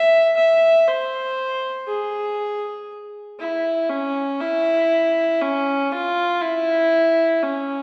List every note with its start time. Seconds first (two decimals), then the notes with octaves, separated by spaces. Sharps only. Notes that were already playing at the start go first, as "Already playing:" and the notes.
Already playing: E5
0.37 E5
0.88 C5
1.88 G#4
3.40 E4
3.89 C#4
4.40 E4
5.41 C#4
5.92 F4
6.42 E4
7.43 C#4